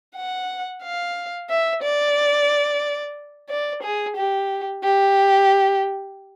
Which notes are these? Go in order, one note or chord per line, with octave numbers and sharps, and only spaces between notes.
F#5
F5
E5
D5
D5
G#4
G4
G4